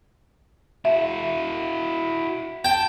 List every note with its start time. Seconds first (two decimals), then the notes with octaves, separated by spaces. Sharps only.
0.85 E4 F#4 E5
2.65 G5 A5